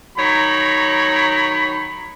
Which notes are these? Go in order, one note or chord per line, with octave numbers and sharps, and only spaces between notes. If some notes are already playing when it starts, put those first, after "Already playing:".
D#3 F#3 C#5 A#5 B5